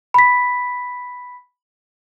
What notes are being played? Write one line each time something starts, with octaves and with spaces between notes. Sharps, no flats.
B5 B6